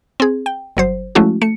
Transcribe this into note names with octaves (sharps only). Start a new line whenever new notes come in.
C4 G#4
G5
G1 F#3 C5
F3 G#3 A3 C#4 E4 F#4
A3 C#7